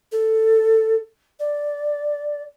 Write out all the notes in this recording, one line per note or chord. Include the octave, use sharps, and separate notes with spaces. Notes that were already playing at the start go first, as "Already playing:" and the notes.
A4
D5